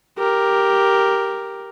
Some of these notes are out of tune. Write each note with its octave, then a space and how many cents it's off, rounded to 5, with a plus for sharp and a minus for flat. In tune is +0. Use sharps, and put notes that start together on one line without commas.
G4 +0 A#4 +0